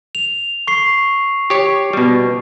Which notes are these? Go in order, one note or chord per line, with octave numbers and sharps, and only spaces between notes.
F7
C#6 C7
G4 C#5
B2 G3